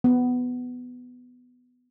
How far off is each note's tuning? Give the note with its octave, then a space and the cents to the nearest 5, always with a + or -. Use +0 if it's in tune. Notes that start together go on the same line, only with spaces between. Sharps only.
B3 +10